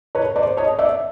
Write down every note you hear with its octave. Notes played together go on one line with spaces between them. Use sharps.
B4 C#5
C5 D5
C#5 D#5
D5 E5